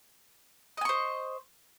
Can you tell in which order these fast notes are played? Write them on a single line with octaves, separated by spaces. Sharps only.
D#5 G#5 C#6 C5